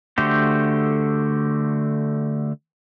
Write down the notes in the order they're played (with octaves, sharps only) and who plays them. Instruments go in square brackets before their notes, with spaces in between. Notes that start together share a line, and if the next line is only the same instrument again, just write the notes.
[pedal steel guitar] D3 A3 F#4 G4 C5